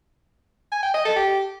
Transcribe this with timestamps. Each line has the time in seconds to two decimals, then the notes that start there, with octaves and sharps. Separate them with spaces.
0.72 G#5
0.83 G5
0.94 D#5
1.05 A4
1.16 G4